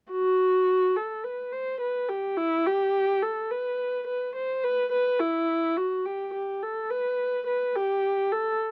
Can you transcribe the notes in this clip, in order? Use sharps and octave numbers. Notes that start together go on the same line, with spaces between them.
F#4
A4
B4
C5
B4
G4
E4
G4
A4
B4
B4
C5
B4
B4
E4
F#4
G4
G4
A4
B4
B4
G4
A4